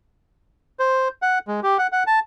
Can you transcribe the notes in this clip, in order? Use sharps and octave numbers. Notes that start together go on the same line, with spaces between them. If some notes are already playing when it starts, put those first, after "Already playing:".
C5
F#5
G#3
G4
F#5
F#5
A5